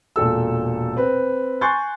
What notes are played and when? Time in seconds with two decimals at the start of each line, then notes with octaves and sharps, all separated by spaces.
0.16 E1 A#2 A4 E6
0.97 C4 B4
1.61 G#5 C6 C#6 F#6 G6 A6